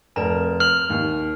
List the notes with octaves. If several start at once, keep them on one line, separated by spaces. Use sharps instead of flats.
F1 A#4 E7
F6 F#7
D#2